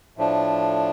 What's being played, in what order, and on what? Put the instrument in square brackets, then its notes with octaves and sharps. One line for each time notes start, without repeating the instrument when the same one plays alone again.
[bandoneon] A2 F3 A3 D4